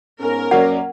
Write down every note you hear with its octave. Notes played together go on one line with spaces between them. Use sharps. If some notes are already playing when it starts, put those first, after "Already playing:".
G#2 B3 C#4 A#4
F#2 F#3 A#3 C#4 D5 F#5